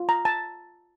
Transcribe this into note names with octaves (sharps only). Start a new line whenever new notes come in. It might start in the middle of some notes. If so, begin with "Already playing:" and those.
Already playing: F4
A#5
A5